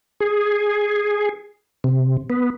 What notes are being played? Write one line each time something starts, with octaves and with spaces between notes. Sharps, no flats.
G#4
C3
B3